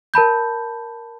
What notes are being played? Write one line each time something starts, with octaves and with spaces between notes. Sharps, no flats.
A#4 A5 B5 G6